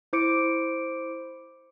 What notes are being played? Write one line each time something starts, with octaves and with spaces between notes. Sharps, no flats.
E4 C5 D6 C#7 D7